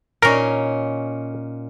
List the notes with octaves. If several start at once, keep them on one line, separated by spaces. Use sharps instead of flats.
A#2 C#4 D#4 A#4